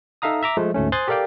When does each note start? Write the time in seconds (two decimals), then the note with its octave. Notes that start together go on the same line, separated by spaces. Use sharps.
0.22 D#4 A4 E5 F5 A#5 D#6
0.43 E5 A#5 D6
0.57 F3 G#3 A3
0.74 D2 G#2 A3 C#4
0.92 C5 G#5 C6 D#6 F#6 A6
1.08 G4 A4 A#4 D5 F5 G5